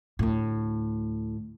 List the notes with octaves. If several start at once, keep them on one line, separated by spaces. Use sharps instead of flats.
D2 A2